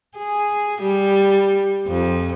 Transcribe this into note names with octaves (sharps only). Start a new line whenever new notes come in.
G#4
G3
F2